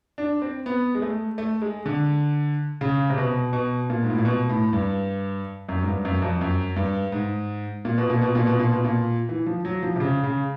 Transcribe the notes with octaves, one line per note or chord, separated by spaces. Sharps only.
D4
C4
B3
G#3
A3
A3
G#3
D3
C#3
C3
B2
B2
A#2
G#2
A2
A#2
B2
A2
G2
F#2
G#2
G2
F#2
F2
F#2
G2
G#2
A#2
B2
A#2
B2
A#2
B2
A#2
B2
A#2
E3
F3
F#3
F3
C3
C#3
C#3